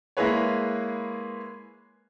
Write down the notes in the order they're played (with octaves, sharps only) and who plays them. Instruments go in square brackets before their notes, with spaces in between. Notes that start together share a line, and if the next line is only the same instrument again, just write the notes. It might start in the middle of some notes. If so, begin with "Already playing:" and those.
[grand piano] G#3 A#3 E4 G#4 B4 C#5